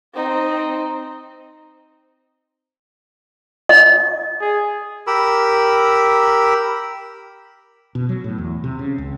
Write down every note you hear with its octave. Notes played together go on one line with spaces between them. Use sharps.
C4 D#4
D#5
G#4
G4 A#4 B5 E6
B2
F#3
A2
E2
C3
C#3
C#2